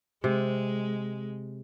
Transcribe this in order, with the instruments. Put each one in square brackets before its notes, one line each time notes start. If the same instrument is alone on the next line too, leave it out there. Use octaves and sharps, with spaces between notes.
[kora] C3 [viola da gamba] G#3